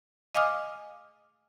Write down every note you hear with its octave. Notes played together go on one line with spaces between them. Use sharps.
D#5 F5 G#5 D6 D#6 F6